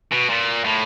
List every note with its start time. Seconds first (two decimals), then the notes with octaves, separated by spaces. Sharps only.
0.12 B2
0.30 A#2
0.65 A2